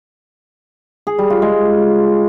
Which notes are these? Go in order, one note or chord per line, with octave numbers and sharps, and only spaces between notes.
G#4
G3
F4
G#3